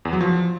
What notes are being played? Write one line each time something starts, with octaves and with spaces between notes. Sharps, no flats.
E2
F#3
F3